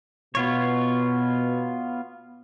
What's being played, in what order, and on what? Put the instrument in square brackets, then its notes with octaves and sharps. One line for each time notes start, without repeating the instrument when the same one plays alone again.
[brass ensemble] B2 [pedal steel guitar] B3 F4 C#5